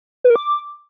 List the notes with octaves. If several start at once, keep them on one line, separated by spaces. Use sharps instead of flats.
B4
A#4
D6